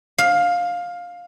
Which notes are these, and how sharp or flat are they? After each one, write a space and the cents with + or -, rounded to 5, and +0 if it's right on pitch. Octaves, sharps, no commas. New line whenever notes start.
F5 +15